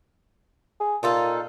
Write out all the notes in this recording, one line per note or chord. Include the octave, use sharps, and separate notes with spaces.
G#4
A#2 D#4 F4 A4